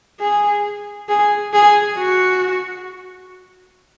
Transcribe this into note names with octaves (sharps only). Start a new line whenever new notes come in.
G#4
G#4
G#4
F#4